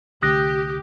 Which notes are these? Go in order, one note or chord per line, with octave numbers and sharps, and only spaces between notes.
C2 D3 A3 G4 D#6 F#6 A#6